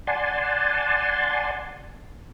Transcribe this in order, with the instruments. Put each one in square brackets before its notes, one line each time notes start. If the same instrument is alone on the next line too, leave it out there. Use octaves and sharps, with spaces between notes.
[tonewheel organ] D5 F#5 G#5 A5 C6